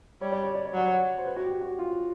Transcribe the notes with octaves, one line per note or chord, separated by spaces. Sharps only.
G3 C#5
D5
C#5
D5
C#5
F#3 D5
C#5
C5
B4
F#4
G4
F#4
F4